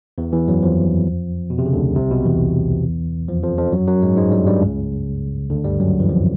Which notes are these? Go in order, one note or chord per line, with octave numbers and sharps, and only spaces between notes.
E2 E3
E2 E3
F#2 F#3
F2 F3
B2
C3
C#3
D2 D3
C2 C3
B1 B2
E2 E3
F2 F3
F2 F3
F2 F3
F#2 F#3
F#2 F#3
G#2 G#3
G#2 G#3
G2 G3
G2 G3
C#2 C#3
D2 D3
G2 G3
F#2 F#3
E3
F2 F3